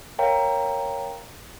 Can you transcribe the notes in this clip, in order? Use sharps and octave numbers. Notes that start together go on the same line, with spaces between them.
A#4 C#5 F5 G5 A#5